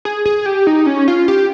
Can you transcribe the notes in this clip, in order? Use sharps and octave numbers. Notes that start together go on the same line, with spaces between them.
G#4
G#4
G4
D#4
C#4
F4
G4